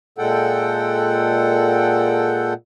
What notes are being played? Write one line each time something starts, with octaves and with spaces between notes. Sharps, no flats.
A#2 G#3 A4 F#5 G5